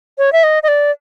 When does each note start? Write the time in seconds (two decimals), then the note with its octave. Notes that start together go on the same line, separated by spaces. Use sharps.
0.18 C#5
0.33 E5
0.44 D#5
0.63 D#5
0.68 D5